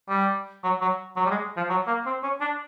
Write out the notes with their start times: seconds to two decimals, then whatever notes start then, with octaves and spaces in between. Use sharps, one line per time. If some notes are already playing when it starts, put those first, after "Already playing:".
0.09 G3
0.63 F#3
0.81 F#3
1.16 F#3
1.26 G3
1.30 G#3
1.57 F3
1.70 F#3
1.87 A#3
2.06 C4
2.23 C#4
2.41 D4